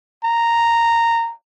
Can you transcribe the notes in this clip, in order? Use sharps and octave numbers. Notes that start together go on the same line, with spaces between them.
A#5